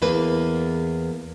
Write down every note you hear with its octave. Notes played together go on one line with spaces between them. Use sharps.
E2 A#3 B4